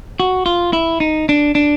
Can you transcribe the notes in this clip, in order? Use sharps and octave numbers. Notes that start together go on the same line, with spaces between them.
F#4
F4
E4
D#4
D4
D4